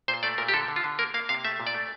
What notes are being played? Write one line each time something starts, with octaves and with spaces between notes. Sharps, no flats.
A#2 C5
A3 D5
A#2 A#4
G4
D3 A4
D3
F4
D3
A#3 A#4
A#3 F5
C3 F5
A3 E5
A#2
D5
A3